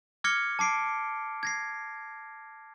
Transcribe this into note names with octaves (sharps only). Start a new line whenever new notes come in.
D6 F6 G#6 A#6 C#7 G7
A5 D6 C7 D7
G#6 A#6 C7